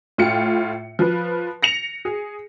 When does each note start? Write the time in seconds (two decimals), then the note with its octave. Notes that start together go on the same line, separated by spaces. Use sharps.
0.18 A2 F4 G5 C#7
0.99 F3 B4
1.63 A#6 C#7 F7
2.05 G#4